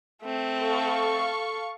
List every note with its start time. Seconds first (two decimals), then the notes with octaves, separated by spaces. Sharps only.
0.23 A3 C4
0.61 A4 F5 C#6